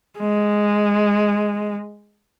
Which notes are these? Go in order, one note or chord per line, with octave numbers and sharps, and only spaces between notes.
G#3